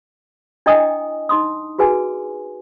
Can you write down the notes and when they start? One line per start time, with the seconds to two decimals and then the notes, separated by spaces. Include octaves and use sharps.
0.66 D4 E4 D#5 G5 G#5 D#6
1.29 D#4 C6 D#6
1.78 F#4 G#4 B4 G#5